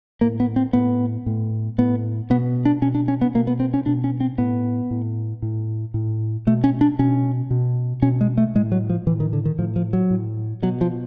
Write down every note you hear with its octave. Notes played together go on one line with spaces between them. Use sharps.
A2 A#3
B3
C4
A2 B3
A2
A2 B3
B2 B3
D4
B2 C#4
D4
C#4
B3
B2 A#3
B3
C4
C#4
B2 D4
C#4
C4
A2 B3
A2
A2
A2
B2 A3
C#4
D4
B2 C#4
B2
B2 C#4
G#3
A3
A2 G#3
F#3
F3
A2 E3
D#3
D3
D#3
A2 F3
F3
F#3
A2
B2 F#3
F3